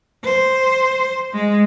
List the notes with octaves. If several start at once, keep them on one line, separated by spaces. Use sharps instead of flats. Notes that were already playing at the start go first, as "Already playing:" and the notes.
C5
G#3